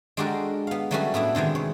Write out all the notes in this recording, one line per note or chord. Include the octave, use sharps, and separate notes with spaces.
G#3 D4 F#4 G4 A4 A#4
B3 F5
F#3 G3 A3 B3 C#4 F#4
A2 B3 D4 E4
C3 D#3 E3 G#3
C#5